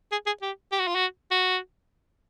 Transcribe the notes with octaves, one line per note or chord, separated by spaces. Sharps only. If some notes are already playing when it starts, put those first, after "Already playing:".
G#4
G#4
G4
G4
F#4
F4
F#4
F#4